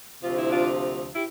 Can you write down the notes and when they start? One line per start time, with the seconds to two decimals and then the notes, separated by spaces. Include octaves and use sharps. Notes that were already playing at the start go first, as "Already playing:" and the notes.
0.22 D2 C3 F3 F4
0.36 E4
0.50 D4 F4
1.14 E4 G4